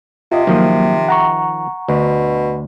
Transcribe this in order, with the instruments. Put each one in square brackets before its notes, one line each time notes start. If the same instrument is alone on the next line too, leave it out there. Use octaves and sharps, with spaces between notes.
[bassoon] C3 [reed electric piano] F4 D#5
[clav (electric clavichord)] D#3 F3 [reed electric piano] F#3 A#3
[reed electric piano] F#5 A#5 C#6
[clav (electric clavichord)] D2 [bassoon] B2